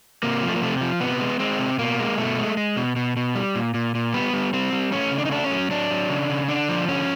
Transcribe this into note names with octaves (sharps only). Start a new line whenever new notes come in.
C3 A#3
F3
A3
A#3
C3 A3
F3
C3 B3
G#3
G#3 C4
C3
B2 A#3
G#3
B2 A3
G#3
G#3
B2
B2
B2
G3
A#2
A#2
A#2
G3 B3
G3
G3 C4
G3
A3 C#4
C#3
D4
D#4
A3 D4
C#4
F#3
F#3 D4
F#3
C#3
C#3
D3 D4
F3
D3 C#4